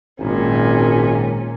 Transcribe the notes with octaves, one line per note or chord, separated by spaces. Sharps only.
G#1 A#2 C#4